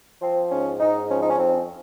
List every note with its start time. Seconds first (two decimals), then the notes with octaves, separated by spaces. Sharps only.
0.21 F3 C4
0.51 G#2 C#4
0.80 G#2 D#4
1.09 F3 C#4
1.22 D#4
1.30 C#4
1.38 F2 C4